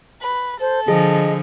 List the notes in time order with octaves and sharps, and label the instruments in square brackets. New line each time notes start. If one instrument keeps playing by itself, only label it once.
[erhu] B4
[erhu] A4 [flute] C5
[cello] D3 F3 [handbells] G#4 [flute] D#5